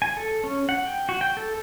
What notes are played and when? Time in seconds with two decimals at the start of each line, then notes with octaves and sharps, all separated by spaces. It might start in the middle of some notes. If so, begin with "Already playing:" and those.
0.02 G#5
0.17 A4
0.44 C#4
0.69 F#5
0.85 G5
1.09 F#4
1.21 G5
1.37 A4